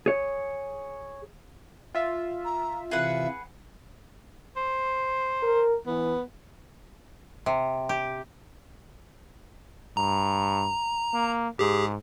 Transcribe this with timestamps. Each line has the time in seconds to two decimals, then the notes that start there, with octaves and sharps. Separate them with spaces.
0.06 G#4 C#5
1.94 F4 E5
2.45 A#5
2.91 C3 E3 F4 G#4 B4 E5 F#5
4.57 C5
5.43 A#4
5.87 E3 B3
7.46 C3
7.89 G4
9.97 G2 A#5
11.14 A#3
11.59 G#2 G4 G#4